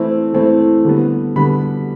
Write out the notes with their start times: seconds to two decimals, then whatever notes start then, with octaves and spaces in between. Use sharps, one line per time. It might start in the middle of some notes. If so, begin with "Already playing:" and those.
Already playing: E3 A3 C4 E4
0.33 E3 A3 C4 E4
0.84 D3 G3 B3
1.36 D3 G3 B3 B5